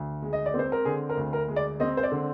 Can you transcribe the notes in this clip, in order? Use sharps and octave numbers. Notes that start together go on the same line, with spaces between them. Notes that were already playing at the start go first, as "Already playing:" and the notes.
Already playing: D2
G#3
D#5
D5
C4
C5
A#4
D3 G#4
A#4
D2
A#4
G#3
D5
C4 D#5
C5
D5
D3